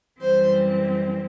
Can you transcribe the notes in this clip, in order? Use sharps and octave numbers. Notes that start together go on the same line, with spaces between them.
F#2 E3 G3 C4 C5